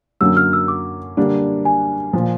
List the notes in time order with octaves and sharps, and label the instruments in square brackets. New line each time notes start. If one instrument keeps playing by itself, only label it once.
[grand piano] F#2 D3 F#3 A#3 C#4 [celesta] E6
[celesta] F6
E6
D6
[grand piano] D3 G3 A#3 D4
[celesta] G#5
[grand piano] A#2 F3